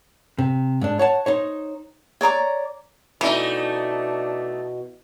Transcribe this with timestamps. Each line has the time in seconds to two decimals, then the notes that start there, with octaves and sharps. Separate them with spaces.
0.38 C3
0.81 G#2 D4
0.99 C#5 F#5 A5
1.26 D#4 C5 C#5
2.21 C#5 D5 A#5 D6
3.21 B2 E3 A3 D4 D#4